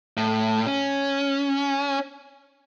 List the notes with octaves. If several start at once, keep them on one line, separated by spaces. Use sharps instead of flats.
A2
C#4